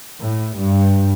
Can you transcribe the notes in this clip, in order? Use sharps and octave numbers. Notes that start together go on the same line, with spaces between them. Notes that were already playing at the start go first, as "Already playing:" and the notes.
A2
G2